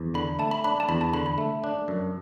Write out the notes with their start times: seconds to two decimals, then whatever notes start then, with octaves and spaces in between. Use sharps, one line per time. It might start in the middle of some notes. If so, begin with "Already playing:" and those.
Already playing: E2
0.14 D3 B5
0.39 A3 A5
0.51 B5
0.64 D4 B5
0.80 A5
0.89 E2 B5
1.01 A5
1.14 D3 B5
1.26 B5
1.38 A3
1.64 D4
1.88 F#2